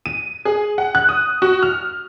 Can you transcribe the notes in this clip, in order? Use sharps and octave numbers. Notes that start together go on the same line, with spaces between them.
D#7
G#4
F#5
F#6
D#6
F#4
F6